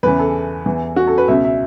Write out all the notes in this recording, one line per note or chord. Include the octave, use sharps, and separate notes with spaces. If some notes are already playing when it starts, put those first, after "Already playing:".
E2 C#3 E3 B4
A4
E2 E3
F#4
A4
B4
C#2 B2 E5
E5